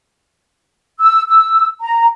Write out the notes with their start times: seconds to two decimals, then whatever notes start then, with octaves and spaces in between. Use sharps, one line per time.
1.00 E6
1.27 E6
1.81 A#5